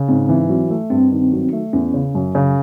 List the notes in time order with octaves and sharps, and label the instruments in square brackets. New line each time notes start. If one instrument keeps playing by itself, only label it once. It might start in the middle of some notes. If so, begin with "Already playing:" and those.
Already playing: [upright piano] C#3
[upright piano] G#2 [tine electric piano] C4
[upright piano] E3
F#3
A3
[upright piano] G2 [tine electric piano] C4
[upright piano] D#3
F#3
A3
[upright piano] E2 [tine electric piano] C#4
[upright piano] C#3
F#2
C#3